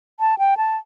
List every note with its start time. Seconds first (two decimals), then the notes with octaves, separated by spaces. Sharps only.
0.20 A5
0.39 G5
0.57 A5